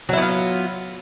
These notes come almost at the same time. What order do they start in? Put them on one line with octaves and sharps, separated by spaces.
F#3 E4 B3 F4